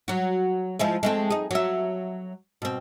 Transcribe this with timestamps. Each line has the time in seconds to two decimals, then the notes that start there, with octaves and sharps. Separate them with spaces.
0.08 F#3 F#4
0.80 F3 G#3 E4
1.03 G#3 A3 C4
1.30 D#4 G#4
1.51 F#3 E5
2.62 B2 C4